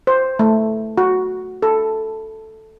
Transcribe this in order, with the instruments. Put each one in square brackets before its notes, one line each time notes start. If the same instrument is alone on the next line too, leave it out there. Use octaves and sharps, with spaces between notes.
[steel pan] C5
A3
F#4
A4